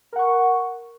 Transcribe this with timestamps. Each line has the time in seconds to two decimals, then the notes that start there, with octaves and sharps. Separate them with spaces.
0.13 A#4
0.16 F#5
0.19 C#6